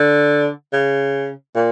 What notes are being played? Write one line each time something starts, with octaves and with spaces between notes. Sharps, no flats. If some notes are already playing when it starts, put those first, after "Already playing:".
Already playing: D3
C#3
A#2